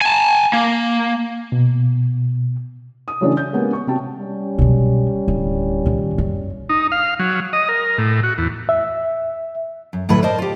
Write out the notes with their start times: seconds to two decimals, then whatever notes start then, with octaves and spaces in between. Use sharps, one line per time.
0.01 G#5 A5
0.53 A#3
1.52 B2
3.08 D#6
3.21 C#3 E3 F#3 A3 C#4 D4
3.37 G6
3.53 G#3 A#3 B3 C#4 G4
3.73 C#6
3.87 C3 F#4 G5 A5
4.16 G3 C#4
4.58 B2 F#3
5.28 D1
5.86 A#2 D#3
6.18 F#2
6.69 D#4
6.92 F5
7.20 F#3
7.53 D#5
7.69 A#4
7.98 A2
8.23 F#4
8.38 E2
8.69 E5
9.93 F#2
10.09 D2 A2 F#3 B4 E5 F#5
10.23 A#4 C5 D5 D#5 A5
10.39 F4 G4